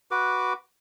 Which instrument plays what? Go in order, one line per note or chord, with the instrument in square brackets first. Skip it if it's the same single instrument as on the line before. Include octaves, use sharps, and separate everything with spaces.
[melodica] F#4 B4 D6